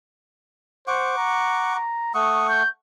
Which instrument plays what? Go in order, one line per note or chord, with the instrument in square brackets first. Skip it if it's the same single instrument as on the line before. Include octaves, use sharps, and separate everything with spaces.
[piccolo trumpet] C5 [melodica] F#5 C#6 D6
[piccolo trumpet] A#5
A#5
[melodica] A3 F#5 C#6 [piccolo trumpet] D#6
[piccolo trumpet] G6